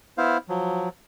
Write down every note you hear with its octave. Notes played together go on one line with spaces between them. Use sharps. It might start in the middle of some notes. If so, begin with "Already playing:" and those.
B3 E4 C5 F5
F3 F#3